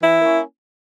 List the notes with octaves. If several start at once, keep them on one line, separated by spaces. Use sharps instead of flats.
E3 E4
A#3 C#4